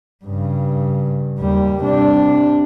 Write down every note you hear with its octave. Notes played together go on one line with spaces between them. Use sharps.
G2 C#3
D#2 G3
C3 D4